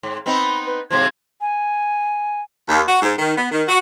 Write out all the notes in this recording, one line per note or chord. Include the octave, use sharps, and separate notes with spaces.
G#2
B3 C4 D#4 B5
B4
G#2 C3 F3 G#6
G#5
D#2
F#4
G#2
D#3
B3
D#3
F#4